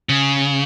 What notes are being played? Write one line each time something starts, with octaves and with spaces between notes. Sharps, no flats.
C#3